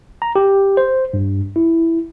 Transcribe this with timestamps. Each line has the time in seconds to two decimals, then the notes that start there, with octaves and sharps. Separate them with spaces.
0.22 A#5
0.36 G4
0.77 C5
1.14 G2
1.56 E4